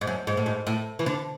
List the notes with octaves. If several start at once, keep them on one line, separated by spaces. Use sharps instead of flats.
G#2
F#2
G#2
A2
G#2
A2
E3
D3